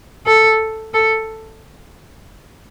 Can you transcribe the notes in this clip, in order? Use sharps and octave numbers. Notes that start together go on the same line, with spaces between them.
A4
A4